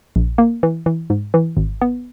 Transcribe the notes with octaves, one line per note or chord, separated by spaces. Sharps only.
A#1
A#3
E3
E3
G#2
E3
G#1
B3